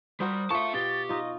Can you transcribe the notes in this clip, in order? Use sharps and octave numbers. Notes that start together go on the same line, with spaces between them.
G3 F#4 A#4 C5 D#6
F4 E5 A5 C#6
B2 G4 A6
D#4 F4 D#5